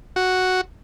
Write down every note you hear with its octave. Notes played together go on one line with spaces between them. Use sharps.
F#4